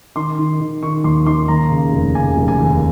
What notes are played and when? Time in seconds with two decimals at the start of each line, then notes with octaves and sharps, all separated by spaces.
0.15 D#3 C6
0.38 D#3
0.60 D#3
0.82 D#3 C#6
1.04 D#2 C6
1.26 D#3 C6
1.48 D#2 A#5
1.70 C#3
1.93 F1
2.15 C#3 G#5
2.37 F1
2.48 G#5
2.59 D#2